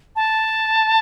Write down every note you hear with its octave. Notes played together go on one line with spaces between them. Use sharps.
A5